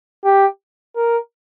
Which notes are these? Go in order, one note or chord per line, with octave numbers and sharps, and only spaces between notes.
G4
A#4